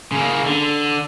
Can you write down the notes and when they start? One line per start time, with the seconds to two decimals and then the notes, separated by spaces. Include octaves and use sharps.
0.12 C#3 A#3
0.46 D3